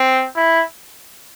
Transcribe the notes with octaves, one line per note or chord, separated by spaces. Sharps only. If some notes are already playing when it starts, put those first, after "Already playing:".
Already playing: C4
E4